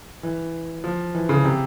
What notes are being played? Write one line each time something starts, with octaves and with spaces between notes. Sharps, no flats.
E3
F3
E3
C#3
C3